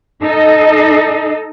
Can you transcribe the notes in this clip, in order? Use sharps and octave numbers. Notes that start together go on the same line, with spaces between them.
D#4 A4 D#5